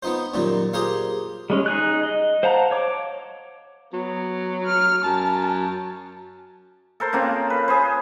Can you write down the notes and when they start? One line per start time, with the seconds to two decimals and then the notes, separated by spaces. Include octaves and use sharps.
0.03 B3 C4 D#4 F4 C5
0.34 F#2 A#2 D#3 G3 F4
0.73 F4 G4 G#4 A#4 C5 F5
1.50 G3 G#3 C#4
1.66 D#4 G#4 F#6
2.03 D#5
2.43 C5 F5 F#5 A5 A#5
2.71 C#5 D6
3.93 F#3 B3
4.65 F6
5.04 F#2 A5
7.00 A4 A#4 C5
7.13 C#3 A#3 C4 F4
7.50 B4
7.68 G#4 C5